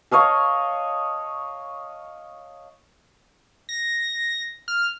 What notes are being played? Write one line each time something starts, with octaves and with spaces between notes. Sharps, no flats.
C#5 D#5 F5 A5
A#6
F6